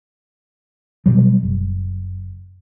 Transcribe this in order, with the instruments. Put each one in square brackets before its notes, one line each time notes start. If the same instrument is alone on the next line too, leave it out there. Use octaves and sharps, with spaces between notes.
[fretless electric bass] B2 F#3 G3
F#1